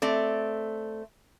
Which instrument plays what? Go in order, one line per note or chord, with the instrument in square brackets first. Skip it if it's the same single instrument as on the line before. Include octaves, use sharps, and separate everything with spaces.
[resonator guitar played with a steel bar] A3 C4 D5